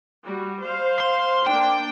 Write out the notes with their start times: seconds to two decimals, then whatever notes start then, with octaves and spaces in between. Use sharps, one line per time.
0.24 G3 F#4
0.62 C5 F5
1.00 C6
1.47 A#3 D4 G5